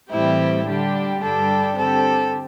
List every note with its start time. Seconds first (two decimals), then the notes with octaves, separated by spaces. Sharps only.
0.11 A2 E3 G3 C4 E4 G4
0.66 D3 G3 D4 G4
1.22 G2 G3 D4 G4 A4
1.78 D3 C4 G4 A4